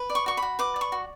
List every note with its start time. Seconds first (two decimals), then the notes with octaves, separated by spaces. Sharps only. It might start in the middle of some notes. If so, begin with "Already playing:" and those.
Already playing: B4
0.10 D5
0.15 C#6
0.26 F#4 C#6
0.37 B5
0.42 F#4
0.59 B4 D6
0.76 D5
0.81 C#6
0.92 F#4